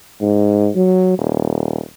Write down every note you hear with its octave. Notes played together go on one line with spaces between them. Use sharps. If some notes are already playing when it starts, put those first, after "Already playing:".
G#2
F#3
D#1